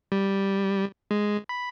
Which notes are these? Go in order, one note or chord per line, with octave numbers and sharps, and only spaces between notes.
G3
G#3
B5